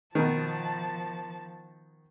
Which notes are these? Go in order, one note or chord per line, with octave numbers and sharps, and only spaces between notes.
B2 D#3 F3 A5